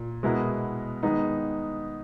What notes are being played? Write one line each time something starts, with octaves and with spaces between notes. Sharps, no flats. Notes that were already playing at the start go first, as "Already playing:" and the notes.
Already playing: A#2
B2 G#3 B3 E4 A#4
D#3 G#3 B3 D#4